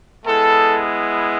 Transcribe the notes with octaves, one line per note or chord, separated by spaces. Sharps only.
G#3 B3 E4 A4